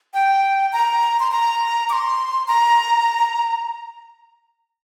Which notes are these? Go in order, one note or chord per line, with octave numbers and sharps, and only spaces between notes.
G5
A#5
C6
A#5
D6
C6
A#5